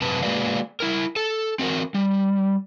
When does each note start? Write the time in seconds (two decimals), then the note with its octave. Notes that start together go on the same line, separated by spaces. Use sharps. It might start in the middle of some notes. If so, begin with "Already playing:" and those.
0.01 F#2 C3 B4 A5
0.23 G#3 A#3 F#4 B4 D5 F5
0.80 E4 A#4
1.16 A4
1.59 C4 F#4 A#4
1.94 G3